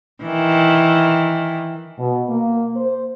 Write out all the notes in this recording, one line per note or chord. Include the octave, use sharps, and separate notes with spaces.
D#3 E3
B2
A#3
C5